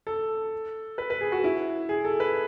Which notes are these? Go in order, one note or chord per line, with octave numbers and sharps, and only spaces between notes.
A4
B4
B4
G#4
F#4
E4
G#4
A4
B4